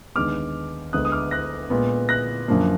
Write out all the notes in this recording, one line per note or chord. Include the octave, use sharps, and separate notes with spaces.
D#2 D3 G#3 B3 D6 F6
D2 D3 G#3 B3 D#6 F#6
D#6
D6 F6
F#6 A#6
A#2 G#3 B3
F#6 A#6
F#2 D3 F3 A#3